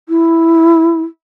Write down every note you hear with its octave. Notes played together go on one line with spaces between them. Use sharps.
E4